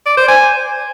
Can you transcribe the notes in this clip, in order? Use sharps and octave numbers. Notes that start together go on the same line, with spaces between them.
D5
C5
G#5